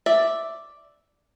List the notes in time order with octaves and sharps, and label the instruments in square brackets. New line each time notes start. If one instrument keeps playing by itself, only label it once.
[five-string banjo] D5 E5